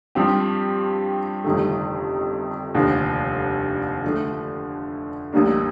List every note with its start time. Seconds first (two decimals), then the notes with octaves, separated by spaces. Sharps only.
0.15 G2 F3 C4 G4
1.45 G1 F2 C3 D#3 A3
2.75 F1 D#2 D3 F3
4.04 D3 F3 A3
5.33 A1 A2 G3 A#3 D4